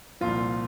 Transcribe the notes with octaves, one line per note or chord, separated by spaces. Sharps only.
C2 A#2 F3 F4